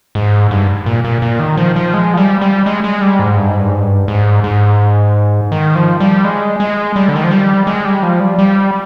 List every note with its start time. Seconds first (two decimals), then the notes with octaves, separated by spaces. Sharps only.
0.15 G#2
0.51 G2
0.86 A#2
1.04 A#2
1.22 A#2
1.39 D#3
1.57 F3
1.76 F3
1.94 G#3
2.14 F3
2.17 G3
2.41 G3
2.66 G#3
2.84 G#3
3.02 G3
3.19 G#2
3.37 G2
3.48 G#2
3.59 G2
3.69 G#2
3.80 G2
4.08 G#2
4.44 G#2
5.52 D#3
5.75 F3
6.00 G3
6.24 G#3
6.60 G#3
6.96 G3
7.08 D3
7.16 D#3
7.24 F3
7.31 G3
7.67 G#3
7.85 G3
8.03 F3
8.20 G3
8.38 G3